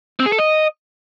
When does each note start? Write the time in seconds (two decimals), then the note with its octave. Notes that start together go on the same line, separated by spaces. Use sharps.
0.20 C4
0.26 G#4
0.32 A4
0.39 D#5